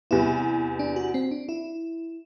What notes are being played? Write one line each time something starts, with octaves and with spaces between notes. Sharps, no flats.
E2 C3 G3 B3 E4
D4
F#4
C4
D4
E4